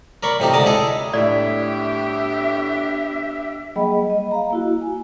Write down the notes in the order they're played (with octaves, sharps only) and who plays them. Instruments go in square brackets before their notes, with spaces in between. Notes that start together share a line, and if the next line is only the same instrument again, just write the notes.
[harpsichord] A#4 D5 B5 C#6
A2 C3 C4 D#4 G4
C#2 D3 D5 A5 A#5 D#6
G#3 E4 G#4 A4 D#5
[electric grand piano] A2 [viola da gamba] B3 D4 G4 [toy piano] D5 [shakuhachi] E5
[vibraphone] F#3 G3 A#3 G#4 D#5 B5
D#5
F5 A#5
A#3 E4 F#4
G#5